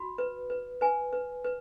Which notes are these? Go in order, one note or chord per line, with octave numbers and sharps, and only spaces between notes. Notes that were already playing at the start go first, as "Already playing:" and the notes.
Already playing: F#4 B5
B4
B4
B4 G#5
B4
B4